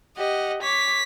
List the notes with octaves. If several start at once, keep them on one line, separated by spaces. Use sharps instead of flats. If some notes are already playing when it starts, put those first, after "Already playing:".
G4 D#5 F#5
C#5 D6 B6